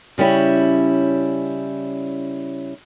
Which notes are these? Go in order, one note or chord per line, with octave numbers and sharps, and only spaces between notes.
C#3 G3 C#4 E4